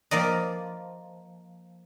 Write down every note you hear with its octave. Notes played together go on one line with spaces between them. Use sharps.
F3 A#3 D5 D#5